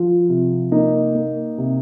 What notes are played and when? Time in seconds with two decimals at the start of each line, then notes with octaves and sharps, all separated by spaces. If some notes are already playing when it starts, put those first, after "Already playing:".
Already playing: F3 F4
0.29 C3
0.72 A#3 D#4
1.15 A#3
1.58 C3